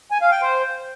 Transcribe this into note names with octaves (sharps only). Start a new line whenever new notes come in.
G#5
F5
G5
C5